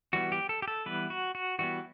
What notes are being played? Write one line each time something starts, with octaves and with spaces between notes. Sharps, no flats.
E3 G3 B3 F#4
G4
A4
G4
A4
E3 G3 B3 B4
F#4
F#4
E3 G3 B3 F#4